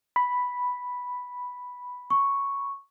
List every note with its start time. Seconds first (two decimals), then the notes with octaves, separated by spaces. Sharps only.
0.16 B5
2.10 C#6